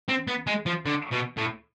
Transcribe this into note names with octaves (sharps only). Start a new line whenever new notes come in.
C4
B3
G#3
F3
D3
B2
A2